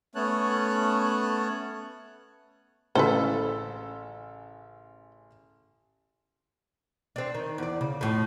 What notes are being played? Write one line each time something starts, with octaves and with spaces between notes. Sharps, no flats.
A3 B3 C#4 C#5 A5 F#6
A1 C#3 A4 B4 C5
C4 D4
D#3
E2 D5
C#3
F2 A2